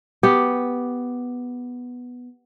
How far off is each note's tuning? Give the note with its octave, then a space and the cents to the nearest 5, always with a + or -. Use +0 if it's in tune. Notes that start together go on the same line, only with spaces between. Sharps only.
B3 +0 G4 +0